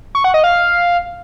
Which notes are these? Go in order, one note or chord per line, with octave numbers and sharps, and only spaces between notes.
C#6
F#5
D#5
F5